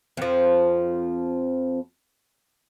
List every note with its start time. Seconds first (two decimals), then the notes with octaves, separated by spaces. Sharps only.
0.17 F2 F3